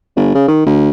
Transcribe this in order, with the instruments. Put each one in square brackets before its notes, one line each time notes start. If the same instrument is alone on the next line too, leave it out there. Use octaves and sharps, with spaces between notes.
[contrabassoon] G1
C#3
D#3
D2